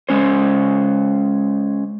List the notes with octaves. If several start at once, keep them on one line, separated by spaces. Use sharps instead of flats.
G#3 C#4 C5